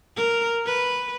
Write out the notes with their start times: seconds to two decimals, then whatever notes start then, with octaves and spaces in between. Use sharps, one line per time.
0.16 A#4
0.66 B4